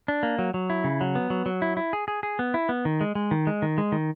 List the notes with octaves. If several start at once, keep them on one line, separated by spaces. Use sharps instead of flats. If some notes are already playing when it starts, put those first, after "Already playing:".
D4
A#3
F#3
F#3
E4
C#3
F#3
B3
F#3
F#3
E4
E4
G#4
G#4
G#4
B3
E4
B3
D#3
G#3
G#3
D#3
G#3
D#3
G#3
D#3